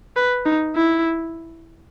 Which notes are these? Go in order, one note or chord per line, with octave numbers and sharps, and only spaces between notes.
B4
D#4
E4